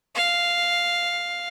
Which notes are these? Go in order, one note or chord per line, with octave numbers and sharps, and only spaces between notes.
F5